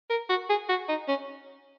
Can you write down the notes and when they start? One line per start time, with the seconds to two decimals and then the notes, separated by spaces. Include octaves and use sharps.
0.10 A#4
0.29 F#4
0.49 G#4
0.69 F#4
0.89 D#4
1.08 C#4